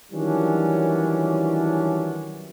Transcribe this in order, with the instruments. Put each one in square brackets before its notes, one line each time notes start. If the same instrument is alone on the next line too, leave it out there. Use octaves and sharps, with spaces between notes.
[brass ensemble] D#3 E3 F#3 G3 C#4 D4